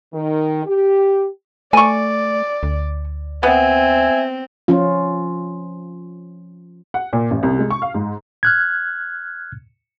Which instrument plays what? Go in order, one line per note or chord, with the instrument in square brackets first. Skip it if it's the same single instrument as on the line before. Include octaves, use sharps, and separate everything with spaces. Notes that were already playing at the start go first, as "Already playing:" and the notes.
[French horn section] D#3
G4
[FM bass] A3 [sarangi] D5 [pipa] G#5 C#6
[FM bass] D2
[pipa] B3 [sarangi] C4 [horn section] E5 G#5
[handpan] F3 C#4 F4
[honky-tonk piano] F#5
A#2
A1
C2
G#3
C#6
F5
G#2
[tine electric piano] F6 F#6 G#6